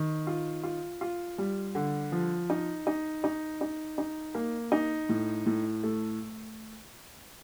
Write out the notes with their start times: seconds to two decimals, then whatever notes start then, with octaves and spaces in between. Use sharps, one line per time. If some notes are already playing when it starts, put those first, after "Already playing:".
Already playing: D#3
0.27 F4
0.63 F4
1.01 F4
1.38 G3
1.75 D3
2.12 F3
2.50 D#4
2.87 D#4
3.24 D#4
3.61 D#4
3.98 D#4
4.35 A#3
4.72 D#4
5.09 A2
5.46 A2
5.83 A3